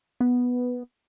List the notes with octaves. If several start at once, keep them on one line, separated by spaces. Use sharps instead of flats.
B3